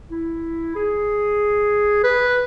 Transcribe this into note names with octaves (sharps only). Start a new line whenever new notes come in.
E4
G#4
B4